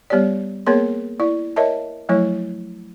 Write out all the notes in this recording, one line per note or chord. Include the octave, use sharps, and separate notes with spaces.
G3 B3 G4 C#5 D5
A#3 B3 G#4 A#4 C#5 C6
E4 D5
A#4 C#5 D#5 E5 A5
F3 F#3 A3 E4 C#5